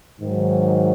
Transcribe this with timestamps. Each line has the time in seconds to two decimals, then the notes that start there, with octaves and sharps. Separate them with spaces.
0.19 G#2 D#3 F#3